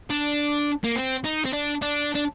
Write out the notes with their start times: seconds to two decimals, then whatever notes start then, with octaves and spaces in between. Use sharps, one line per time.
0.10 D4
0.84 A#3
0.96 C4
1.24 D#4
1.45 C4
1.53 D4
1.82 D4
2.15 D4